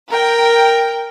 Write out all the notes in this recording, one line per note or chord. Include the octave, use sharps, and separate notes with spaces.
A#4 G5